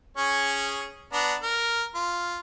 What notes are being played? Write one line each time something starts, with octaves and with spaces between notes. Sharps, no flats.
C#4 G#4 C#5
B3 D4 A#5
A#4
F4